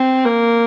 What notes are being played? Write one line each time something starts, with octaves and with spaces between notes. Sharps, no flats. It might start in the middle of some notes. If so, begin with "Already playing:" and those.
Already playing: C4
A#3